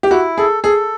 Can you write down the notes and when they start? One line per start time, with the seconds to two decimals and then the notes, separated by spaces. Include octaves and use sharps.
0.03 G4
0.11 E4 F#4
0.37 G#4 A4
0.63 G#4 A4